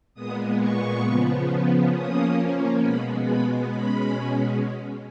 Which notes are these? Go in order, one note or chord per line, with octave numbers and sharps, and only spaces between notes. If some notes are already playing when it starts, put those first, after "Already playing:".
A#2 G#3 B3 D#6
C#6
C#3 F3 B3
F3 A#3 C#4 D#6
B2 G#3 B3 B5
B5
B2 G#3 C#4 B5